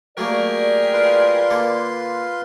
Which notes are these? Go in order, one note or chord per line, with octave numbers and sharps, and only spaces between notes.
F#3 A3 A#3 G4 G#4 A#4 D5
F4 B4 C6
D3 A#3 A4